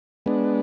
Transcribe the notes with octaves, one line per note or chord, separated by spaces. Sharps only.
G#3 B3 D4